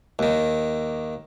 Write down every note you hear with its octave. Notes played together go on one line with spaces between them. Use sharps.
D#2 D#3